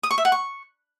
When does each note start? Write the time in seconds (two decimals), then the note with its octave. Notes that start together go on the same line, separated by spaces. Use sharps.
0.03 D#6
0.11 C#6
0.18 E5
0.25 F#5
0.32 C#6